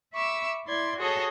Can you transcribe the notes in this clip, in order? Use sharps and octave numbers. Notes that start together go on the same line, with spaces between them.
E5 B5 C#6 D6 E6
E4 D5 C6 G#6
F#4 G#4 A4 C#5 D#5